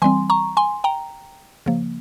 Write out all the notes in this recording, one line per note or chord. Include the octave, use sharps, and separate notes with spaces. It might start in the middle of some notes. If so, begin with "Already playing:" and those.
E3 G3 C4 G#5 C6
A#5 C#6
G#5 C6
G5 A#5
C#3 F3 A#3